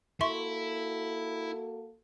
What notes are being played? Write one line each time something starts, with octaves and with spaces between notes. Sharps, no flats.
A#3 E4 F#4 A4 E5 C6 C#6